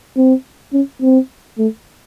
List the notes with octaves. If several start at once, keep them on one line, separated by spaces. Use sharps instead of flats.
C4
C#4
C4
A3